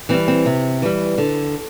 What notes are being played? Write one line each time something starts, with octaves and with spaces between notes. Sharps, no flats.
E3 G3 C4
C4
C3
E3 G3
D3